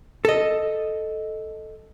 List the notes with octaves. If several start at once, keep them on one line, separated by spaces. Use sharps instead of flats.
A4 D#5